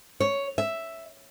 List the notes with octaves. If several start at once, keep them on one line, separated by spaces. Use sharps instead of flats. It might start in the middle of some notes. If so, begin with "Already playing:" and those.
C#5
E5